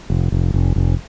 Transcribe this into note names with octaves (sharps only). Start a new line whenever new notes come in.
F1
F1
F1
F1